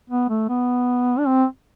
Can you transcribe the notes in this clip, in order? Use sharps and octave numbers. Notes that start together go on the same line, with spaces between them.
B3
A3
B3
D4
C4